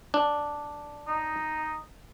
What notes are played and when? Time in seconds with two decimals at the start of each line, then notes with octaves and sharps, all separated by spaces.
0.14 D4
1.08 D#4